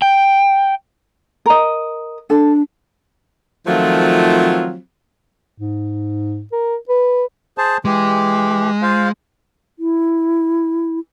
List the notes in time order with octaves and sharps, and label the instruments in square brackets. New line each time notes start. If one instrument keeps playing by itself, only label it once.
[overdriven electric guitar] G5
[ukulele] A#4 D#5
[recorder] D4 [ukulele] A4
[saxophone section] D#3 F3 F#3 A3 C4 F4
[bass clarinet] G#2
A#4
B4
[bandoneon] G#4 C5 A5
[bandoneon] E3 G4 [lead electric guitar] G#3
[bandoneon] F4 C5 F5
[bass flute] E4